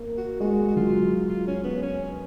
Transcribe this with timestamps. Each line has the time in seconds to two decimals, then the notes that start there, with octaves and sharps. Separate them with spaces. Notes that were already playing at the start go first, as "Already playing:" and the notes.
Already playing: A#3
0.17 F#4
0.40 G#3 F#4
0.68 F#4
0.76 F#3 F4
1.29 F4
1.47 C#4
1.64 B3
1.82 C#4